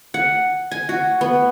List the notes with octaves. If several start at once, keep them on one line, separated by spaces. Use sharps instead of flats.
F#5
G#5
F#4
B3